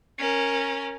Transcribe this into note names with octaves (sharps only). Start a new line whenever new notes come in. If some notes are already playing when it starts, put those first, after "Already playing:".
C#4 A#4